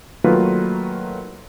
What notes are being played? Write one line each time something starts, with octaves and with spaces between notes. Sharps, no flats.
D#3 F#3 A3 A#3 F4 B4